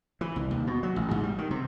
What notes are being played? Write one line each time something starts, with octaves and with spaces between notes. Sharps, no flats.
E3
C2
D#2
B2
F#3
A1
G#2
G3
D#3
C3